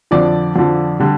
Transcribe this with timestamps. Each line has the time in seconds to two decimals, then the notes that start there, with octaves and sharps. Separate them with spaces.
0.11 F2 D3 F3 D5
0.56 F2 D3 F3
1.00 D3 G3